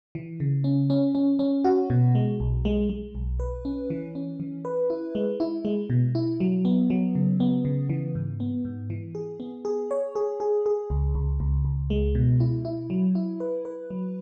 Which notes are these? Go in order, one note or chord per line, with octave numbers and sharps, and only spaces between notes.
E3
C#3
C#4
C#4
C#4
C#4
F#4
B2
G#3
B1
G#3
G#3
B1
B4
C#4
E3
C#4
E3
B4
E4
G#3
E4
G#3
B2
E4
F#3
B3
F#3
C#3
B3
C#3
E3
G#2
B3
G#2
E3
G#4
B3
G#4
C#5
G#4
G#4
G#4
C#2
C#2
C#2
C#2
G#3
B2
E4
E4
F#3
E4
B4
B4
F#3